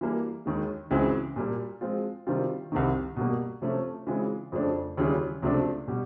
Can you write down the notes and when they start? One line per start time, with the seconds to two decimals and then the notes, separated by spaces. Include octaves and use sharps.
0.01 E3 G3 A#3
0.46 D#2 D#3 G#3
0.91 C#2 C#3 E3 G#3 C4
1.36 A#2 G3 A#3
1.81 F3 G#3 C4 F4
2.27 C3 D#3 G3 C4 F4
2.72 C2 C3 D#3
3.16 B2 G3 A#3
3.62 C3 F3 A3 C#4
4.07 C#3 E3 G#3 C4 F4
4.52 F2 C#3 F3 A3 D4
4.97 D#2 C#3 E3 G3
5.42 C#2 C3 F3 A3 D4
5.87 B2 G3